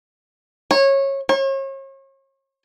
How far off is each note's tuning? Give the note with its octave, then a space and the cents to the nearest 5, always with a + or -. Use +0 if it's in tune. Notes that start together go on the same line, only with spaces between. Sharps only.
C#5 -20
C#5 -40